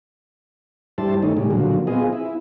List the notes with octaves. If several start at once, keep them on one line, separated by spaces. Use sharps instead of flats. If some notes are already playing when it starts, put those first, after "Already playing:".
G2 G3 E4 C5 A5
D#3 A3 C#4 D#4
A2 C#3 G3 G#3
A#2 D3 F3 F#3
B3 C4 F4 G#4 D#5
E4